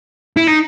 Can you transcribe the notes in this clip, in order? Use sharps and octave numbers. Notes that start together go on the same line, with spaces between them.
E4
D#4